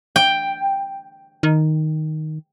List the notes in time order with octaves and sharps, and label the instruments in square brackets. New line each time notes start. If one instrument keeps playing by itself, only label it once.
[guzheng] G5
[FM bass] D#3